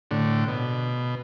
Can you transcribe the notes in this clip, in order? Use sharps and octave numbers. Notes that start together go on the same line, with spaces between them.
A2 D3
B2